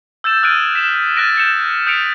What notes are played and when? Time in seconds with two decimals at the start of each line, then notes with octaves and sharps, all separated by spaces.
0.24 E6 G6 A6 E7
0.43 D#6 F6 F#6 G#6 D7 D#7
0.75 B6 E7
1.16 F6 F#6 A6 A#6 D7 D#7
1.35 G6 C#7 E7
1.87 D#6 G6 B6 C#7 D7 F7